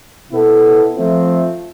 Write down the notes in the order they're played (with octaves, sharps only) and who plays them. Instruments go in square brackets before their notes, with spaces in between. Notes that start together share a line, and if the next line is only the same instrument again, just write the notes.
[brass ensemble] B2 B3 E4 A4
F3 A3 C4 F4